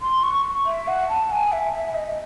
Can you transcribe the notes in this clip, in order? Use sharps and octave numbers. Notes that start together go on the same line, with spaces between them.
C6
C#6
E5
F#5
A5
G#5
E5
E5
E5
D#5